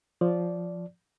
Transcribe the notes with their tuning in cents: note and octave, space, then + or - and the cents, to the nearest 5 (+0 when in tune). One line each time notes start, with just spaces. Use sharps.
F3 +0 D5 -15